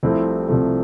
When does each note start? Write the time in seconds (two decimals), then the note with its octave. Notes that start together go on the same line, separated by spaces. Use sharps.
0.03 C2 C3 F3 A3 C4 E4
0.48 C2 C3 F3 A3